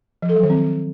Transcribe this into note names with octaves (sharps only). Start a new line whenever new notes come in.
F3
A4
F#3
D#3
C4